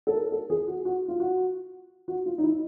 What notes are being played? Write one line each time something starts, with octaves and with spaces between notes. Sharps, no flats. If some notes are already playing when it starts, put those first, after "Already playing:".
A4
A#4
A4
G#4
F#4
F#4
F4
F#4
F#4
F4
D#4
E4